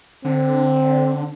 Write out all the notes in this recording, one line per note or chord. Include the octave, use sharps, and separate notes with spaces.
D3 C4